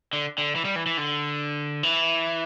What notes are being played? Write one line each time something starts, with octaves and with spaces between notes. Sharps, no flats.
D3
D3
E3
G3
E3
E3
D3
E3